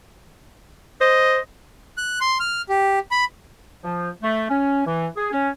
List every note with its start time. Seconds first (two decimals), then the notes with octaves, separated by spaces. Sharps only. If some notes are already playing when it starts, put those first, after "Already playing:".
1.01 C5 D#5
1.97 F#6
2.21 C6
2.40 F6
2.69 G4
3.11 B5
3.84 F3
4.23 A3
4.50 C#4
4.86 E3
5.16 G#4
5.32 C#4